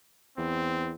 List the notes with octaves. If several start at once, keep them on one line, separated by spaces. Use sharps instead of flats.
E2 C4